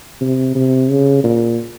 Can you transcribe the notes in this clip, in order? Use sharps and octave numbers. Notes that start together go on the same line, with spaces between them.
C3
C3
C#3
A#2